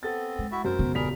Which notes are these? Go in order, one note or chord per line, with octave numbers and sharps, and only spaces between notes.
B3 C4 A4 A6
G#3
E4 F#4 E5
F#2 A#4 C5
C#3 B3
D#1 G3 G#4 A#4 B6 F7